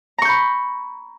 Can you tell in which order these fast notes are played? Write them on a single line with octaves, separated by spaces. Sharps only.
A#5 C#6 G6 B5